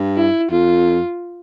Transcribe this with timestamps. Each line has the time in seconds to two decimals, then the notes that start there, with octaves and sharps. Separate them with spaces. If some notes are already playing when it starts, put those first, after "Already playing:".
Already playing: G2
0.16 E4
0.51 F2 F4